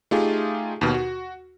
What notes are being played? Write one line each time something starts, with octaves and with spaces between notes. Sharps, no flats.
A3 D#4 F4 G4 G#4
D#2 B2
F#4